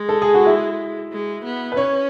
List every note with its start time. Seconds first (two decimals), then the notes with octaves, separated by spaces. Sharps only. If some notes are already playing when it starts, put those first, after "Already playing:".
Already playing: G#3
0.09 A4
0.22 G#4
0.34 F#4
0.46 E4
1.12 G#3
1.45 B3
1.72 B4
1.77 C#4 C#5